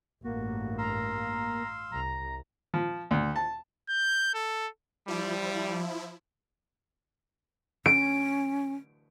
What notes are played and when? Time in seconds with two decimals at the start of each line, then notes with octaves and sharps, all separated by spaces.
0.24 A1 G2 A#3 F#4
0.78 F5 A#5 C6 E6
1.92 C2 A#5
2.74 F3
3.11 D2
3.36 A5
3.89 G6
4.34 A4
5.08 F3 G3 E4
7.86 C#4 D7